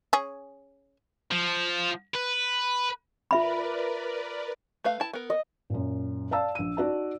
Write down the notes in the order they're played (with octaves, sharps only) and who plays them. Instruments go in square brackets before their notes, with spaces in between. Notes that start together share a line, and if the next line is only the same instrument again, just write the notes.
[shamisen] C#4 G#4
[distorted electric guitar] F3
B4
[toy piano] F4 E5 B5 [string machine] A#4 B4 D5
[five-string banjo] A3 B4 F5
E4 A5
B3 A#4
[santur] D#5
[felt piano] F#2 A#2
D5 F5 A5 E6
A#1 D#7
D#4 F#4 D5 A5